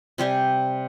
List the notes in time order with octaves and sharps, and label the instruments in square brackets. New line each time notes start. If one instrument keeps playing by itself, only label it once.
[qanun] C3 G3 G4 G#5